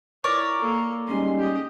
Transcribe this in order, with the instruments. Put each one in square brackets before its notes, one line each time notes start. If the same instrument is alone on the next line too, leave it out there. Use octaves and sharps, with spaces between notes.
[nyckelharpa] E4 [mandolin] A#4 C#5 D5
[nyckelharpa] A#3 A4
[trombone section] G#2 G3 G#3 [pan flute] C#4 [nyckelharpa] C6
[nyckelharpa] G4 D#5